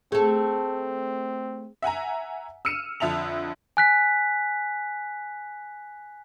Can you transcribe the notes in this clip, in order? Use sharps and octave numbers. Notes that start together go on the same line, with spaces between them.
A3 C4 G#4 A4
E5 F#5 G#5 A#5
E6 F6 C#7 D#7 E7
F2 D3 E5 A5 F7
G#5 F#6 B6